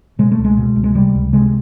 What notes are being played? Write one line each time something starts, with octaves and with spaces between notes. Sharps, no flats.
B2 G#3
A3
C#2
G#3
B2
C#2
G#3
C3 G3
C#2
C3 G#3